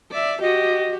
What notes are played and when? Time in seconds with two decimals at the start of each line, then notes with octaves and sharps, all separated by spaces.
0.11 D5 E5
0.41 F#4 G4 D#5